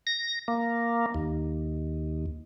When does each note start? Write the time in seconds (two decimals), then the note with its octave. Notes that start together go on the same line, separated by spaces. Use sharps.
0.07 A#6
0.48 A#3
1.15 D#2